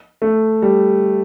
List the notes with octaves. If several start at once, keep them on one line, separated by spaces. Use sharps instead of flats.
A3
G3